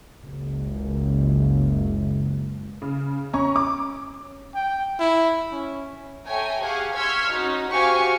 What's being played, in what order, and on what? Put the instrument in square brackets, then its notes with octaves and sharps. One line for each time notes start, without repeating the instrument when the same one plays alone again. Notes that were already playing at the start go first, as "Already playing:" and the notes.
[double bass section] F#1 C#2
[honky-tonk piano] C#3
[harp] C#4 [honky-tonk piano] A#5 C#6
[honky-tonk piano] D6
[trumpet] G5
E4
C#4
[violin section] A4 C#5 E5 G5 G#5 A#5
G4 G#4 F5 F#5 G#5 C#6
C6 C#6 E6 F6 G#6 B6
C#4 D#4 F#4
F#4 G4 C5 F5 G#5 C#6